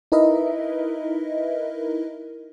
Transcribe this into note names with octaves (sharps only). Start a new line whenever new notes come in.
D#4 E4 A#4 B4 D#5 E5